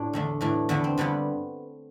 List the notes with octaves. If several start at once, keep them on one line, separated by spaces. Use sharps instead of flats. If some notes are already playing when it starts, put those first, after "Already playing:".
Already playing: A2 D4
E2 D3 A3
A2 E3 A3 D4
E2 D3 A3 B3
C4
G2 D3 G3 B3